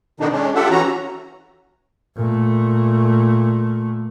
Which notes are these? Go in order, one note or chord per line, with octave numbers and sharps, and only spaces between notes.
B2 D3 D#3 D4 D#4
G#3 C#4 D4
F4 G4 A4 E5 F#5
E3 C#4 F#4 A#5
A#2 A3